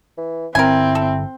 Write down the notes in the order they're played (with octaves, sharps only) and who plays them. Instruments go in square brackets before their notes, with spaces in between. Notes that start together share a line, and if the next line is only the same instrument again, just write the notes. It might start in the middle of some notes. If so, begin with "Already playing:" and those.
[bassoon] E3
[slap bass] G1 [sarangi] C4 [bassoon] E4 [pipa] A#4 G#5
[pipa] A4